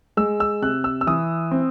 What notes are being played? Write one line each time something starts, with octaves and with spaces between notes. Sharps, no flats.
G#3 E6
E6
C3 F#6
E6
E6
E3 D#6
C4